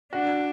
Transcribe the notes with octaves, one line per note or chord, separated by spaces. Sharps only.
D4 F#4